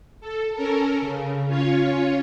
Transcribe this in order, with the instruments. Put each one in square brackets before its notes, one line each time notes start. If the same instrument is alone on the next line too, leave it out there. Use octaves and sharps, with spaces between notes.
[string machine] A4
C#4 A4 A#4
C#3
C#4 F4 C#5